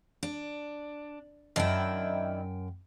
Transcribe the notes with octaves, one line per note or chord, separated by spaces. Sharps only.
D4
F#2 D#3 D4 E4 G5